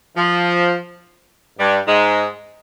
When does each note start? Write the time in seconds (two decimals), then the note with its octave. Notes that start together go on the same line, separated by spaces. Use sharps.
0.16 F3
1.59 G2 G3
1.87 G#2 G#3